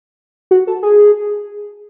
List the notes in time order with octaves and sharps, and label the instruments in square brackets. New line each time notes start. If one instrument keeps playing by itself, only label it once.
[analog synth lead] F#4
A4
G#4